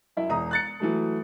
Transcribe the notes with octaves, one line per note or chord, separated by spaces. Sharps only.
F#2 E4 E5
E1 A#5 D#6
F#6 A6 C#7
E3 F#3 A3